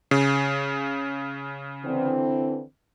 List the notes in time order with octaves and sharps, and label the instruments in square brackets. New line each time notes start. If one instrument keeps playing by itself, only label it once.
[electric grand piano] C#3
[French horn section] D3 E3 C4